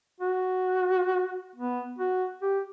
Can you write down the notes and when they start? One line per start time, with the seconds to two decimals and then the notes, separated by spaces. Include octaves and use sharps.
0.21 F#4
1.56 B3
1.98 F#4
2.42 G4